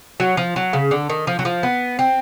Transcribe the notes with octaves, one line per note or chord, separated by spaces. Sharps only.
F#3
F3
F#3
C#3
D3
D#3
F3
F#3
F3
B3
C4